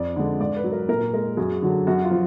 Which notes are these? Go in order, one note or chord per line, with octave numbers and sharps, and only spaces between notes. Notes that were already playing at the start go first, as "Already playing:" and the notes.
Already playing: F2 D5
D3 G#3
G#2 D5
B4
F#3
A#4
A#2 A#4
G#3 A#4
F#2 G#4
D3 F#3
F#2 F#4
F4
F3